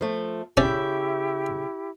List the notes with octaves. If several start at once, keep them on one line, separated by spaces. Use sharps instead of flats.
F3 A3
C#3 C#4 E4 G4 D5 E5 G5